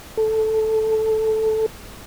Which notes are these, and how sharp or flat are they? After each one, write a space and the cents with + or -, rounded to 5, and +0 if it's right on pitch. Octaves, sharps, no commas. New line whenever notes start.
A4 -5